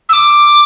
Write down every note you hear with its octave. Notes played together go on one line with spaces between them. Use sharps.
E6
D6